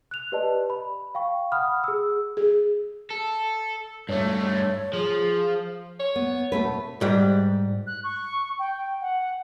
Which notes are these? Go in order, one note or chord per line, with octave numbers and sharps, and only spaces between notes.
F#6 F7
G4 B4 D5 D#5 A5
B5
F5 G5 C#6
F#5 B5 D#6 F6
G#4 E6
G#4
A4
G2 A3 C#5
F3 G#4
C#5
B3
B2 A3 B4
G#2 G3
F#6
C#6
G5
F#5